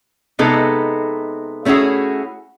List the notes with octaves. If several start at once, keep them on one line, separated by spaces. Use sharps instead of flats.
C3 G#3 B3 D#4 A4
A3 C#4 E4 F#4 G#4